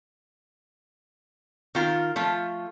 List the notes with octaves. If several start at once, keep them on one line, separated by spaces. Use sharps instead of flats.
D#3 F4 A#4
F3 A3 F4